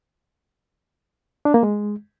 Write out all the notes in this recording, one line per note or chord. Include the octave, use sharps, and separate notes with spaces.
D4
A#3
G#3